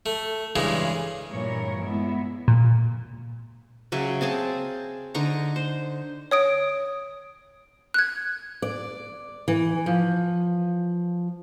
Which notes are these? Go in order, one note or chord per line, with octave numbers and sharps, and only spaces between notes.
A3
G2 C#3 E3 G#3
G2 A#2 E3 A#4 C#5
G#3 B3 E4
A#2
C#3 F#3 G#4 E5
C4 G#4 F5 A5
D3 D#4 A#5 C#6
C5
C#5 D#6 D7
F#6 G#6
D5
E3
F3